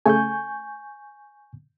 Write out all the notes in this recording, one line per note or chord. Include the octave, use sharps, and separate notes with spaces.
C#3 A3 G#5 C#6 G6